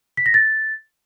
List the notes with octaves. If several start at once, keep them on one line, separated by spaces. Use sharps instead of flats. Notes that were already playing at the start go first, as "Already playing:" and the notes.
B6
A#6
A6